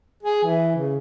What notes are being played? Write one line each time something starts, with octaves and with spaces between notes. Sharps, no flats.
G#4
E3
C#3